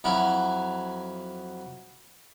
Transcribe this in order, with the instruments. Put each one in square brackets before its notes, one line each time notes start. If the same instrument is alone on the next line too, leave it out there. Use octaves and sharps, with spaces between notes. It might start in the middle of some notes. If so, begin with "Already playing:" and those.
[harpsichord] F2 F#3 E4